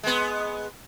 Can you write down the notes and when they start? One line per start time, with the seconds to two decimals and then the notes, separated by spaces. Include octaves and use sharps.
0.03 G#3 B3